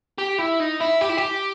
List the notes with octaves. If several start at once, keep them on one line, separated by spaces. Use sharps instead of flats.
G4
E4
D#4
E4
G4
E4
G4